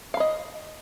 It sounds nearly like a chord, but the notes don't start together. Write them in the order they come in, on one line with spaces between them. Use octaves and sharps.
F5 B5 D#5